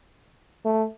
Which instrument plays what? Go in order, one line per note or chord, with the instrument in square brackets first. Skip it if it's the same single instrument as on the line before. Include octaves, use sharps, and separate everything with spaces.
[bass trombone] A3